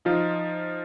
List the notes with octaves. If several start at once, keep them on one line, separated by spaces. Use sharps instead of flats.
F3 D#4 F4